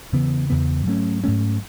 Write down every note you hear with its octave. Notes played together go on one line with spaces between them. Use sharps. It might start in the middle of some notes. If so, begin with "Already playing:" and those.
E2 C#3 E3 B3
E2 C#3 E3 B3
G#2 F#3 A3 C#4
G#2 F#3 A3 C#4